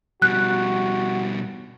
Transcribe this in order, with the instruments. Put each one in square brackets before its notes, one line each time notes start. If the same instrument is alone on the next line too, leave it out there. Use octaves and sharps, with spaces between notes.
[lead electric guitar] B2 G3 [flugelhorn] F#4 [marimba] F#6